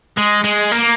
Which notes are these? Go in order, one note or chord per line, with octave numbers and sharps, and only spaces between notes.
G#3
G#3
A#3